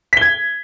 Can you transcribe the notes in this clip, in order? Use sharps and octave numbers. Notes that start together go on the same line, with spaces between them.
G#6 B6 G7